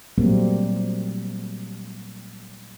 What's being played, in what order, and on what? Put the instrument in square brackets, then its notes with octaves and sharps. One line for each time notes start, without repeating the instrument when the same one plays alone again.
[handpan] A#2 F#3 G3 A3 A#3 C4